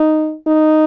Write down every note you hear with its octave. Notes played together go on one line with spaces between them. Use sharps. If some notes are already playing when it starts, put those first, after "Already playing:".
Already playing: D#4
D#4